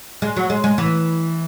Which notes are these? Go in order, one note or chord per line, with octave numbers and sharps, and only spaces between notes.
G#3
F#3
G#3
G#3
E3